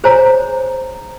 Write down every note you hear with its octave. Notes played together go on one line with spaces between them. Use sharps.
G#4 C5 C#5 G#5 A#5